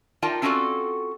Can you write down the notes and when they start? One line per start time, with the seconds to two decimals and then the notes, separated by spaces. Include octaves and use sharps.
0.22 D#4 F4 A#4 D5 G5 A5
0.42 C4 C#4 F4 F#4 A4 D5